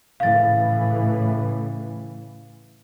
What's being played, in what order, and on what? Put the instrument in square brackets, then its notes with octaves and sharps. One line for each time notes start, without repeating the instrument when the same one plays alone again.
[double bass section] A2 C#3 E3 [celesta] F5 A6